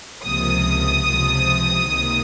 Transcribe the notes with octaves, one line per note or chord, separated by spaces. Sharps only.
C#2 C3 F3 A#3 D#6
C#2 C3 F3
C#2 C3 D#3 A#3